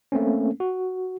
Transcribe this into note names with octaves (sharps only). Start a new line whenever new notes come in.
A3 A#3 C4 C#4
F#4